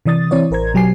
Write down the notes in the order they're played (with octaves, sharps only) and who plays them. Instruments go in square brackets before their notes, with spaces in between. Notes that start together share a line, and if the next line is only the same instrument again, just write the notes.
[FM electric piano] C3 E3 D5 D#6 A6
E3 C4 E4 C#5 D5
A1 A#4 C5 A#5 G#6
B2 F#3 G4 G#5 C7